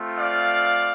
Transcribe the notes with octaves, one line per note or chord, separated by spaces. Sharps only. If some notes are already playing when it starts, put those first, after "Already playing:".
Already playing: A3 C4 F4
D5 F5